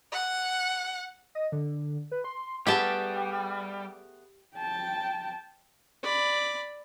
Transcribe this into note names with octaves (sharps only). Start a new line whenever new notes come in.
F#5
D#5
D3
B4
C6
G3 A3 B3 G4 G#4 G5 A5
G5 A5
D5 B5